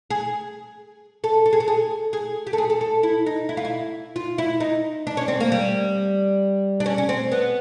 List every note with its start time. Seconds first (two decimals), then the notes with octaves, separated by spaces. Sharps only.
0.10 G#4
1.24 A4
1.46 A4
1.53 G#4
1.60 A4
1.68 G#4
2.13 G#4
2.47 G4
2.53 A4
2.58 G#4
2.70 A4
2.81 A4
3.03 E4
3.26 D#4
3.49 E4
3.57 F4
3.65 E4
4.16 F4
4.38 E4
4.60 D#4
5.07 D4
5.17 C#4
5.28 C4
5.40 A#3
5.52 G3
6.80 D4
6.86 C#4
6.98 C#4
7.09 C4
7.32 B3